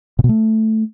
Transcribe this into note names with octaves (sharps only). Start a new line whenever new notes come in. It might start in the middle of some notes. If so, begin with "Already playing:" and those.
A#2
B2
A3